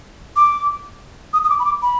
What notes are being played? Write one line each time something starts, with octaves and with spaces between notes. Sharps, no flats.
D6
D#6
D#6
D6
B5
D6
B5